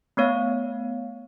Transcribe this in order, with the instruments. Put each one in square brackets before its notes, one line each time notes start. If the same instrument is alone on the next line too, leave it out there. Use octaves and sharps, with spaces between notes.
[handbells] A3 B3 C#5 F5